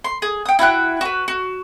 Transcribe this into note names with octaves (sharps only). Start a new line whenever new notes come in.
C6
G#4
G5 D#6
E4 F#4 G5 F#6
F#4 B4
F#4